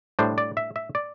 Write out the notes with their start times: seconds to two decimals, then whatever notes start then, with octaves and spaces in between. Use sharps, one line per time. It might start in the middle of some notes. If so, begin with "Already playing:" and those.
0.19 A2 G3 D4 C5
0.38 D5
0.57 E5
0.76 E5
0.95 D5